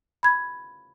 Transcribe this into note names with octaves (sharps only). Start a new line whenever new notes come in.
B5 G#6